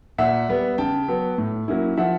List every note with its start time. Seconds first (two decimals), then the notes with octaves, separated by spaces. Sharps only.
0.18 A#2 E5 F#5
0.49 G3 B3
0.78 C#3 G5 A5
1.08 F#3 B3
1.38 A2
1.68 F#3 A#3 C#4 E4
1.97 F3 E5 F#5